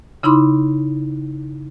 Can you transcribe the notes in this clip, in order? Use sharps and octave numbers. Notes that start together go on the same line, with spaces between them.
C#3 D#4 E4 B5 C6 D6